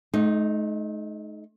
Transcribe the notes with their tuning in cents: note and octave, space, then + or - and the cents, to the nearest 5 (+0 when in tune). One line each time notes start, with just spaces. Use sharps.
A3 -45 D#4 -5